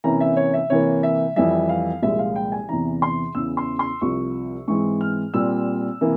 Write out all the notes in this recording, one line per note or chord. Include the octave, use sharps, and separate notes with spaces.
C3 E3 A#3 C#4 A#5
E5
C#5
E5
C3 E3 A#3 C#5
E5
F2 E3 G3 E5
F5
C2 A#2 F3 G#3 E5
F5
G5
G#5
E2 C3 E3 A#5
C6
E2 C#3 E3 E6
C6
C6
C2 C3 F3 C#6
G#2 E3 G#3 C4 C#6
F6
A#2 G3 C4 E6
C3 E3 A#3